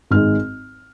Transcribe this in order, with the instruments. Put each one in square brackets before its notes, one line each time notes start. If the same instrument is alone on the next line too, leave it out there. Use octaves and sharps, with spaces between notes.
[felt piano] G#1 G#2 G#3 F6